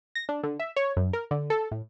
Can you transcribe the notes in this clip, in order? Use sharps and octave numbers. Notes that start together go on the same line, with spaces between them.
A#6
D4
D3
E5
C#5
F#2
A#4
D3
A4
A2